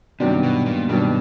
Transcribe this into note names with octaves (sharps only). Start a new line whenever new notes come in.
G2 C3 D#3 F#3 B3 D4
B2
A#2
G2 B2 D#3 F#3 B3 D4